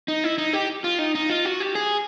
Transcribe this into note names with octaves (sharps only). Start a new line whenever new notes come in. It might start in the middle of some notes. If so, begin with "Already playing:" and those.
D#4
E4
D#4
G4
F4
D#4
D#4
F4
F#4
G4
G#4